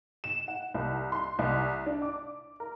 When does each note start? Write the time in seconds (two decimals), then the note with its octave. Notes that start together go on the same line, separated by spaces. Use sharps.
0.24 E7
0.48 F#5
0.74 C2
1.12 C6
1.39 C2
1.86 D4
2.02 D6
2.60 A#4